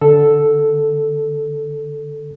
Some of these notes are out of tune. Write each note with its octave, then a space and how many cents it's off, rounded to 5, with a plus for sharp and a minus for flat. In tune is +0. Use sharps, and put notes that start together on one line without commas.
D3 +0 A4 +0 E6 +0